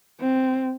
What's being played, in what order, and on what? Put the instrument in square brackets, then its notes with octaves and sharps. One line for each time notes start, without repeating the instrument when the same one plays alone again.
[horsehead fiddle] C4